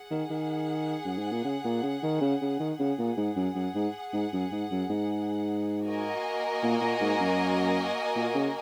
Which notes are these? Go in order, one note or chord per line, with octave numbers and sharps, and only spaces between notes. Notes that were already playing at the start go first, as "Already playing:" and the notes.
Already playing: G#4 F#5
D#3
D#3
F#2
G#2
A#2
C#3
A#2
C#3
D#3
C#3
C#3
D#3
C#3 G#4 F#5
A#2
G#2
F#2
F#2
G#2
G#2
F#2
G#2
F#2
G#2
A#3 F#4 A#4 D#5 G#5
A#2
A#2
G#2
F#2
A#2
C#3